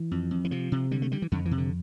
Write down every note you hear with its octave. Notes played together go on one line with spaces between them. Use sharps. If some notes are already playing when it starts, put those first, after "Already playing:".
Already playing: E3
F2
F2
E3
C3 F3
C3
D3 G3
A3
D3 G3
E3
F2 D3
E3
C3
D3